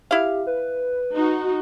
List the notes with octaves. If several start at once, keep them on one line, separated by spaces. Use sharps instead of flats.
E4 G4 F5
B4
D#4 F#4